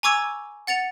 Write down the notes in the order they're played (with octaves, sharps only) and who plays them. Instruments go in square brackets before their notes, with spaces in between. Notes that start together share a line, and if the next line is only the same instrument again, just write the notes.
[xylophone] G#5 A#5 C#6 D6 E6 G#6
F#5 A6 C#7 F7